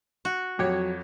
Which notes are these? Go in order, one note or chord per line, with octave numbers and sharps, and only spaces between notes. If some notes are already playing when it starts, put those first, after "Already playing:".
F#4
F2 F#3 G4 C#5